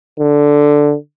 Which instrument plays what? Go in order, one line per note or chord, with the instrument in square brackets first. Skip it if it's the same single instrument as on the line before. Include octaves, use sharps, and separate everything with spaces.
[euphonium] D3